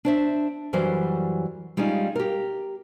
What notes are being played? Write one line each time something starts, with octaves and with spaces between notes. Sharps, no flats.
D4 C5 E5
F#2 E3 F#3 G3 A#4 C5
G3 G#3 C#4 D#4 F4
G4 A#4